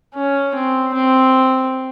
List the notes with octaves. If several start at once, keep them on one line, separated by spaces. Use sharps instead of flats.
C#4
C4
C4